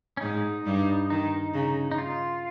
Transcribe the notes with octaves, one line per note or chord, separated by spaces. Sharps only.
C#4
G#2 G#3 D#4
G2 G3
D#3 D#4
C#3
D#4
F4